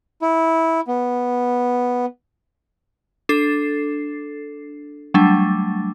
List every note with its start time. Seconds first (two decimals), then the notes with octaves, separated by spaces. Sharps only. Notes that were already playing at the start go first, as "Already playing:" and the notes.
0.22 E4
0.88 B3
3.29 D4 A4 C7
5.14 F#3 G3 A3 D4